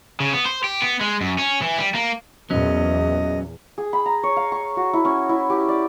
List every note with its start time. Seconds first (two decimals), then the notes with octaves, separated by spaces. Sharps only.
0.20 C#3
0.33 B3
0.46 C5
0.64 G4
0.82 B3
1.01 G#3
1.21 F#2
1.39 C#4
1.62 E3
1.78 G3
1.95 A#3
2.50 E2 A#2 F#3 C#4 D#5
3.78 G#4
3.93 B5
4.06 A#5
4.23 C#5
4.36 F5
4.52 C#6
4.77 F#4
4.93 E4
5.05 C#4
5.29 E4
5.50 G4
5.69 D5